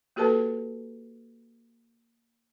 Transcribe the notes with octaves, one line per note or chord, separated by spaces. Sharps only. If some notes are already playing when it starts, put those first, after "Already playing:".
A#3 F#4 G4 A4 B4 A5